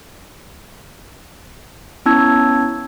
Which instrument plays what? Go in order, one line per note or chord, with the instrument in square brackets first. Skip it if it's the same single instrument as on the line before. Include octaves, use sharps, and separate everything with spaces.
[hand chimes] B3 C#4 E4 A5 E6 G#6